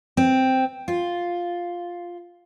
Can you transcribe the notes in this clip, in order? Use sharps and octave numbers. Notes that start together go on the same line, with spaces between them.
C4
F4